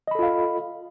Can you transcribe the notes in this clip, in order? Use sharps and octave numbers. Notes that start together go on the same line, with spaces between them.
F4 A4 D#5 F5 B5